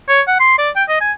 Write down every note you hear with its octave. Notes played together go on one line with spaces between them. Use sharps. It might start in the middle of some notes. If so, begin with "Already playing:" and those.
C#5
F#5
C6
D5
G5
D#5
G#5